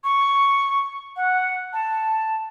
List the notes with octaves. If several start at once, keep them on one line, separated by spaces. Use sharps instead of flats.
C#6
F#5
A5